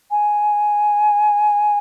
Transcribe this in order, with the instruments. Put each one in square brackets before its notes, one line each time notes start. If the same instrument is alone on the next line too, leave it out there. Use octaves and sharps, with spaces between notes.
[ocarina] G#5